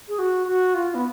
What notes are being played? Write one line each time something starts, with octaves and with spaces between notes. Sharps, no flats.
G#4
F#4
F#4
F4
B3